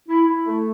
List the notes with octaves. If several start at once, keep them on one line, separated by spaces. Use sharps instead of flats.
E4
E4
A3